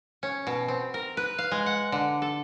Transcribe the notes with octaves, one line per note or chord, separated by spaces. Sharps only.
C#4
B2
C4
A#4
B4
F5
G#3
F#5
D3
A4